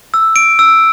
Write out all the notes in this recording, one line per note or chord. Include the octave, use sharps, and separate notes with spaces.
E6
D7
E6